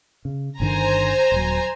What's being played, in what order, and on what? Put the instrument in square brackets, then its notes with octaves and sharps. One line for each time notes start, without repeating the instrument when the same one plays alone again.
[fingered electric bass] C#3
[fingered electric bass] G1 D3 D#3 [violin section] C5 G#5 A#5
[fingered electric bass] D#1 F#3